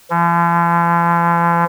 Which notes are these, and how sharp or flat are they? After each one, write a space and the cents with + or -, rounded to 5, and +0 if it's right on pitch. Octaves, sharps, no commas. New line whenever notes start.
F3 -45